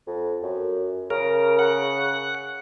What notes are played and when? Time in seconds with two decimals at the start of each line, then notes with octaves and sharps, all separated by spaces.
0.07 F2
0.42 F#2
1.10 C#3 A#4
1.59 F#5